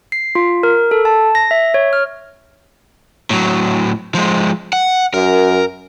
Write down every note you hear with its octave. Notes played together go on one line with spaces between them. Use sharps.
C7
F4
A#4
A4
A5
A#6
E5
C#5
F6
A2 F#3
F3 G#3
F#5
F#2 A#4